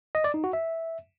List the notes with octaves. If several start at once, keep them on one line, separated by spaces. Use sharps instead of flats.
D#5
D5
D#4
F#4
E5